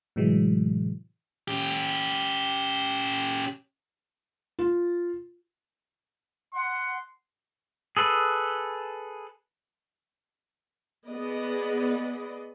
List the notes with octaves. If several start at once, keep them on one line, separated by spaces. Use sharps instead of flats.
A2 C3 E3 F#3 G#3
C#4 G4
F4
F#5 C6
G#4 A4 B4
B3 G#4 B4 D5 D#5